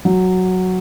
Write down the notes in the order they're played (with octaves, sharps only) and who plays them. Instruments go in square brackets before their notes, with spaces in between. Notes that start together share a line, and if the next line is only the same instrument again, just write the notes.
[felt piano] F#3